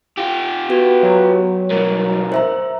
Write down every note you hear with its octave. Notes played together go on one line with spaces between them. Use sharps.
F4 G4
B3 F#4
F#3
G2 B2 A#4
C5 E5 A#5